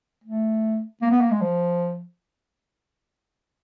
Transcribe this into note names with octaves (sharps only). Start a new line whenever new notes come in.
A3
A#3
B3
A#3
G#3
F3